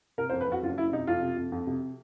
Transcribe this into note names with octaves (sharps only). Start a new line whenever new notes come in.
C3 A#4
C5
F2
B4
F2 F#4
F#1 F4
F#1 E4
C3 D#4
F2 F4
C3
F2
F2
C3